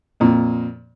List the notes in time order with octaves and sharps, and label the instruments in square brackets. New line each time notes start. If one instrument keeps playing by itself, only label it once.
[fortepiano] F2 A#2